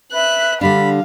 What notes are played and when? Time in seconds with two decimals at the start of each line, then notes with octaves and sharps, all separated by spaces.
0.12 B4 E5 F#6
0.61 D3 G3 D4 F5 B5